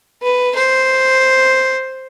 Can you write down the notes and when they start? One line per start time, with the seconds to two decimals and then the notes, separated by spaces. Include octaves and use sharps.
0.22 B4
0.55 C5